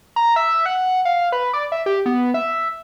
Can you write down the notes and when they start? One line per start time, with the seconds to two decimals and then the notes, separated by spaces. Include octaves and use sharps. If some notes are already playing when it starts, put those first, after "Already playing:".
0.16 A#5
0.36 E5
0.66 F#5
1.05 F5
1.32 B4
1.54 D5
1.72 E5
1.86 G4
2.06 B3
2.34 E5